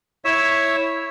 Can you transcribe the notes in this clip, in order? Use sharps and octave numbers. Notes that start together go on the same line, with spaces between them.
E4 C#5 E5